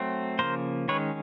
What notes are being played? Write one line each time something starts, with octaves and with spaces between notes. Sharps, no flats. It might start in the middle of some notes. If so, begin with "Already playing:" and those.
Already playing: F#3 A3 C4
C#3 F3 A#3 A#4 C5
D#3 G#3 C#4 B4 C#5